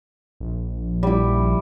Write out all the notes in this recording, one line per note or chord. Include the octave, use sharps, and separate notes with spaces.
A#1
G3 E4